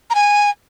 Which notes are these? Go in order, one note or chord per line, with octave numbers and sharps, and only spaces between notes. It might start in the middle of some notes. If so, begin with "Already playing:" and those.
A#5
G#5